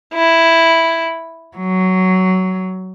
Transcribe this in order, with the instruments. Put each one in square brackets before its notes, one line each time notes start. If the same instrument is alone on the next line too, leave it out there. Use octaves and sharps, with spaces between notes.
[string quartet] E4
F#3